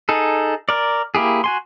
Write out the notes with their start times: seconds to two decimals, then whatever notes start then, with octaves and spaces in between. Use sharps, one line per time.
0.09 D#4 G#4 A4
0.69 A#4 D5
1.15 A#3 E4 G4 G#4
1.44 F#4 G#5 C6